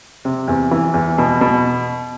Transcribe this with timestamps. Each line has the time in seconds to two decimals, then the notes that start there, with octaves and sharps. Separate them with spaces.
0.25 C3
0.48 E2
0.71 E3
0.94 E2
1.18 B2
1.41 B2